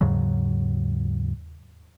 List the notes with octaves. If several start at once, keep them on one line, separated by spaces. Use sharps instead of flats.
D#2 G#2 C#3 F#3